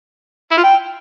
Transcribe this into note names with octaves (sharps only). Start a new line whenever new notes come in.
E4
F4
G5